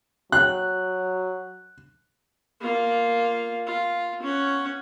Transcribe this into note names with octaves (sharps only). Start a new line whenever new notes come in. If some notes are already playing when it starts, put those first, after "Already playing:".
F#3 F#6
A#3 F4
F4
C#4 F#5